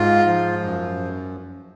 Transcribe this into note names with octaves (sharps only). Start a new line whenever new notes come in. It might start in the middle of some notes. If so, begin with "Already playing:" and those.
Already playing: G#2 F4
F3
F#2